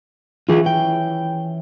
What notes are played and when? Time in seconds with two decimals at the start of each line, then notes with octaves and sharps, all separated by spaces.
0.49 E3 C#4 F4 G#4
0.66 G5